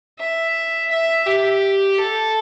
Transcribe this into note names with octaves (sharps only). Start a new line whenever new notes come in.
E5
E5
G4
A4